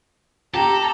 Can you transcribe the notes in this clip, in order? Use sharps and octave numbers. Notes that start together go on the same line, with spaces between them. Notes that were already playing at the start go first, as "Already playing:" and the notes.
G4 A4 A#5